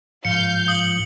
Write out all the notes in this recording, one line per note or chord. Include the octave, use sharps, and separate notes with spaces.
G#2 F3 F5 G6 C#7
D#6 F#7